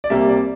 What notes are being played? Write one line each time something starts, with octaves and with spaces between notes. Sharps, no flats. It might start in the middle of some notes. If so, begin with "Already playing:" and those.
D5
C2 C3 G3 A#3 E5
D5